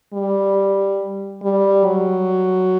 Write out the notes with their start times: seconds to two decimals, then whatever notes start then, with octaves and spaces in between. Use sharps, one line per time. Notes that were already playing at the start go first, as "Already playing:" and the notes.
0.13 G3
1.43 G3
1.86 F#3